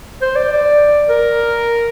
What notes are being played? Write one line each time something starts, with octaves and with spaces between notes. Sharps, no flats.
C5
D5
D5
A#4